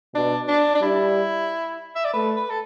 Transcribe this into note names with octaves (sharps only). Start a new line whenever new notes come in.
B2 D4
D4
D4
G3 E4
E5
D5
A3 B4
B4
A4